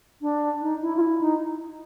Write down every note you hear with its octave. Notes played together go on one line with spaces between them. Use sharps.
D4
D#4
E4
F4
E4
D#4